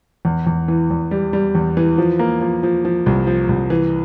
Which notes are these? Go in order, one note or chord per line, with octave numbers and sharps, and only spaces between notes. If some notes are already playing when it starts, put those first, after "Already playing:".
E2
E2
E3
E2
G3
G3
E2
E3
F3
A#3
F3
F3
F3
C2
F3
C2
E3